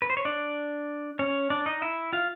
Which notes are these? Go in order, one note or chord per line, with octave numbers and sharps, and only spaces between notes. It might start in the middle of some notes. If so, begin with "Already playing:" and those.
B4
C5
C#5
D4 D5
C#4 C#5
D4 D5
D#4 D#5
E4 E5
F4 F5